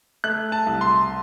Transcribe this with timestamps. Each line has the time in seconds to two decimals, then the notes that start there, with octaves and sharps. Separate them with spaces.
0.24 A3 F#6
0.52 A5
0.66 C2
0.81 C6